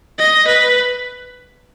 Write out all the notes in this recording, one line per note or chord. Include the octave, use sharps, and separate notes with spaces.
D#5
B4